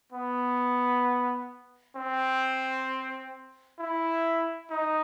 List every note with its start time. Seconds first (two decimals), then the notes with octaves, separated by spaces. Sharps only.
0.12 B3
1.96 C4
3.79 E4
4.71 D#4